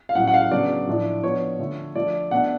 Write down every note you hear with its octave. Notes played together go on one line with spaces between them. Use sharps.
F5
A2 F#3 C#4 F#5
F#5
F5
C#3 F#3 B3 D4 D5
A2 F3 A3 D4
F3 B3 D4 C#5
D3 F3 A3
F3 A3 D4 D5
B2 A3 D4 F#5